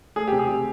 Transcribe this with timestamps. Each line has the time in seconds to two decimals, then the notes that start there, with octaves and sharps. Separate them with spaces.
0.16 A3 G#4
0.28 C3 G4
0.39 G#4
0.49 C3